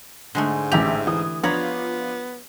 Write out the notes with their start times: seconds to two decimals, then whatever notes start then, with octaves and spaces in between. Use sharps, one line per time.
0.35 G#2 D3 G#3 A3
0.72 A1 G4 E5 F7
1.07 E3 D#6
1.43 F3 B3 D4 F4 C#5 A#5 B5